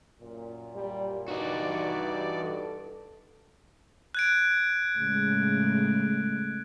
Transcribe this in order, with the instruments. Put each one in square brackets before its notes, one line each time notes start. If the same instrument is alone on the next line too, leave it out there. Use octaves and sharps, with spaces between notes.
[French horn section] F#2 A#2
[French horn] G3
[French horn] G2 [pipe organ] E3 D5 [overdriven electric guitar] D#4 F#4
[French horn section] A4
[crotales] F#6 G#6 D7
[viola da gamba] A2 C#3 G#3